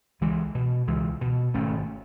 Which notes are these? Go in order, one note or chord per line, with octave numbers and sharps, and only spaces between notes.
C#2 E3 G#3
B2
C#2 E3 G#3
B2
G#1 A3 C#4